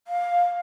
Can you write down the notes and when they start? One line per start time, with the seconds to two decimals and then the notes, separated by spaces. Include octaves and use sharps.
0.08 F5